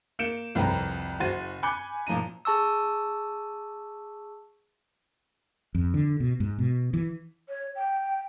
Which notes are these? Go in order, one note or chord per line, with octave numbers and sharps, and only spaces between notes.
A#3 G6 C#7 D7 E7
C2 F2 B4 G5 A#5
F#1 F#4 C5 A6 D#7
G#5 B5 D6 F#6 G6 C#7
A#2 F3 A#5 D#7
G#4 A5 C#6 E6
F2
D3
B2
G#2
B2
E3
C#5
G5